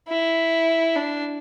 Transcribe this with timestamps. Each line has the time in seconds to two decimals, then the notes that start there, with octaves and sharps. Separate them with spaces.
0.08 E4
0.96 D4